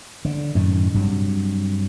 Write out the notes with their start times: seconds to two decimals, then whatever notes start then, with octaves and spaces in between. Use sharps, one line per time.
0.25 D3
0.55 F#2 A2 D#3
0.94 G2 C3 F#3